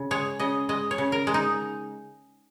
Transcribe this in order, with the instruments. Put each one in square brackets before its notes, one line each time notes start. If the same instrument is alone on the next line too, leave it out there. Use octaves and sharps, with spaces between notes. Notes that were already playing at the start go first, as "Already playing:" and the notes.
Already playing: [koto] C#3
G#3 C#5
C#3 D#5
G#3 D#5
C#5
C#3
A#4
G#3
D#4